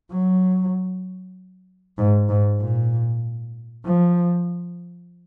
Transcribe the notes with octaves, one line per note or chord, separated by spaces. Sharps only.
F#3
G#2
G#2
A#2
F3